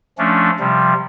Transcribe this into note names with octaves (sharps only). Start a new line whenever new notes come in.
F3 A3 C#4 D4
C3 F3 G3